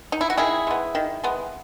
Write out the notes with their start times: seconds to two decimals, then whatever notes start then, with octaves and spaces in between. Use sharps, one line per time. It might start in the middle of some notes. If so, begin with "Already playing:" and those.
0.12 D#4
0.21 E4
0.30 F#4
0.38 D#3 E4 G#4
0.67 G#3 B3
0.95 D#3
1.24 G#3 B3